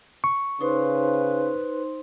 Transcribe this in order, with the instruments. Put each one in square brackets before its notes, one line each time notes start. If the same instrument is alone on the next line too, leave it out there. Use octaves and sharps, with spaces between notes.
[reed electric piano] C#6
[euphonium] C#3 [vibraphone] D#4 C5 C6 [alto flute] B4